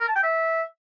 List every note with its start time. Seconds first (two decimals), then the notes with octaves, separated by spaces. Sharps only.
0.01 A#4
0.08 A5
0.16 G5
0.23 E5